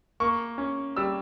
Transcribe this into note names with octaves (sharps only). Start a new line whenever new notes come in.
A#3 C#6
C#4
G3 E6